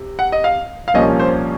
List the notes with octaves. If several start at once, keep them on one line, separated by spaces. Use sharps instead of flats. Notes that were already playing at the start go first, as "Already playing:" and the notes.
Already playing: C3
F#5
D#5
F5
F5
C2 A#2 F3 A#3 C#4 D#5
C5